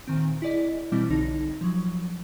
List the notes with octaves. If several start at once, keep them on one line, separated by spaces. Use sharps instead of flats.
A#2 D#3 C4
E4 G#4 D5 D#5
B2 E3 G3 C4 E4
B1 D3 D#4 A#6
F3 F#3